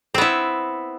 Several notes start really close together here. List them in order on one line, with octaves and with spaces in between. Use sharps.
C4 B3 E4